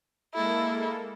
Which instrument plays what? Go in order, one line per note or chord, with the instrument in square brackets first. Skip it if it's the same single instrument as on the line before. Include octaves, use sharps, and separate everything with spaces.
[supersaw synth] G#3 A#3 A4 [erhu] E4